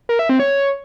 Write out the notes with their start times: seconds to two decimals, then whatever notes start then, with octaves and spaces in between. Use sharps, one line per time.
0.09 A#4
0.19 E5
0.29 C4
0.40 C#5